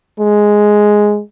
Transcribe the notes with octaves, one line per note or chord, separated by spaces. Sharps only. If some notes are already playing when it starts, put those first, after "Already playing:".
G#3